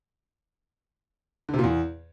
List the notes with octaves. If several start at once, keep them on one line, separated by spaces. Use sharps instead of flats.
D3
C3
A#2
E2